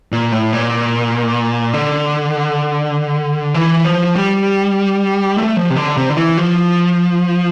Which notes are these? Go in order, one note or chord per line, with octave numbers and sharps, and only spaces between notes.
A#2
A2
A#2
D3
E3
F3
G3
A3
F3
C3
D3
C3
D3
E3
F3